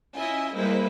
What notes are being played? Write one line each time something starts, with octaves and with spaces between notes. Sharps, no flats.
C#4 E4 F4 D#5 E5 G#5
G3 G#3 A#3 E4 B4 C5